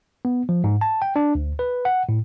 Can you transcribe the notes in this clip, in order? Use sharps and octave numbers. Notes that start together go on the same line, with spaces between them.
B3
F3
G#2
A5
G5
D4
D2
B4
F#5
A2